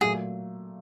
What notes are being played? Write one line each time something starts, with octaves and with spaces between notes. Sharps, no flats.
A#2 F#3 A3 G#4